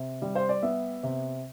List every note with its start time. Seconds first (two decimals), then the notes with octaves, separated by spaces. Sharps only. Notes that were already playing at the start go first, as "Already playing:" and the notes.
Already playing: C3
0.22 G3
0.35 C5
0.49 D5
0.62 B3 E5
1.03 C3